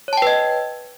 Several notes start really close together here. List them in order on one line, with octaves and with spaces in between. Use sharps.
C#5 A5 G5 B4 D#5